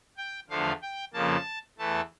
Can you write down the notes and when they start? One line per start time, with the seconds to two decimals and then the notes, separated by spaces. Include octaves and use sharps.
0.17 G5
0.50 E2 D3 F3 A3 F5
0.82 G5
1.14 F2 C#3 F3 A#3 A5
1.78 E2 E3 A3 A5